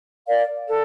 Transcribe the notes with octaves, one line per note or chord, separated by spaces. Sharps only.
A#4 D5 F5
A4